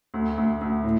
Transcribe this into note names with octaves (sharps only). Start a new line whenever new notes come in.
D2
D2
D2
A2